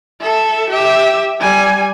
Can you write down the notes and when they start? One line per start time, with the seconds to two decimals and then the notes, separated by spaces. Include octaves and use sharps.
0.21 A4 E5
0.70 G4 E5
1.41 G3 G#5